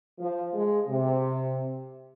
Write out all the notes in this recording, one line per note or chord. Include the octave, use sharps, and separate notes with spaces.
F3
G#3
C3